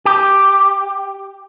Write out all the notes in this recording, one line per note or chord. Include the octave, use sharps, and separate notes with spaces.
G4